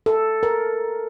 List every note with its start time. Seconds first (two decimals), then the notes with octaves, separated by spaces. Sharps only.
0.06 A4
0.43 A#4